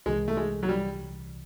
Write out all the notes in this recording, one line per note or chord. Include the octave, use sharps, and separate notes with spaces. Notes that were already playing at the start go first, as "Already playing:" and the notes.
C2 C3 E3 G#3
A3
G#3
F#3
G3